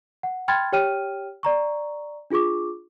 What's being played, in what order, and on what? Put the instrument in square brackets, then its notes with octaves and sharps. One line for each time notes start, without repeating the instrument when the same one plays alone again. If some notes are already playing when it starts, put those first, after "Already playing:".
[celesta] F#5
G5 B5 C6 F6 G#6 A6
G4 C#5 G5 F6 D#7
D5 A#5 C#6
D4 F4 G#4 C#6 D6